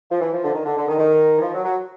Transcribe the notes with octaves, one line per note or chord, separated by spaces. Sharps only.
F3
E3
F3
D3
D#3
D3
D3
D#3
D#3
E3
F3
F#3
F#3